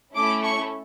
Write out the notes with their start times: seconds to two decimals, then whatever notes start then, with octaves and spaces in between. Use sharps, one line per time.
0.15 A3 C#4 E4 A4 D6
0.43 C#6